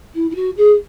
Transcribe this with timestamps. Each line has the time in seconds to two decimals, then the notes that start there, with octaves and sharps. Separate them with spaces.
0.14 E4
0.30 E4
0.35 F#4
0.57 G#4